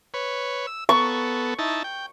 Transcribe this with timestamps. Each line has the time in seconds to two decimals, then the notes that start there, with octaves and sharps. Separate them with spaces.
0.14 B4 C#5
0.67 E6
0.89 B3 A4 C#6
1.59 D#4 E4 A5
1.84 G5